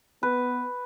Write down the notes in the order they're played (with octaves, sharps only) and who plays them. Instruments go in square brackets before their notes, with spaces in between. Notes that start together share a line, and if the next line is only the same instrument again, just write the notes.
[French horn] B3 [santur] B4